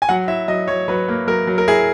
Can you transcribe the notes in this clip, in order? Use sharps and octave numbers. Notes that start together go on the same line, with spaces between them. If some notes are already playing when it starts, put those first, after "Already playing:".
G#5
F#3 F#5
E4 E5
F#3 D#5
F#3 C#5
F#3 B4
A#3
F#3 A#4
F#3
A#4
E4 G#4